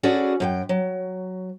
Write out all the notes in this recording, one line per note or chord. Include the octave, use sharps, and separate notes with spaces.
C#4 E4 F#4 G#4 A4 D5
F#2 A4 G5
F#3